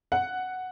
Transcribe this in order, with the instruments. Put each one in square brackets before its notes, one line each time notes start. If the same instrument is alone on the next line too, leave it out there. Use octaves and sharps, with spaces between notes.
[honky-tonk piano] F#5